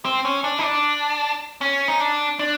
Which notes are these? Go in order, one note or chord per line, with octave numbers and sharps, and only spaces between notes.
C4
C#4
D4
D#4
D4
C#4
D#4
D4
D4